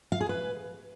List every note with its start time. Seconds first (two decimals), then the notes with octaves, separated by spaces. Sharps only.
0.12 F5
0.21 G#4
0.29 B4